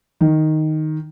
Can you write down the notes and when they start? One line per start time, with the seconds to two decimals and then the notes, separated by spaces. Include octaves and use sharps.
0.21 D#3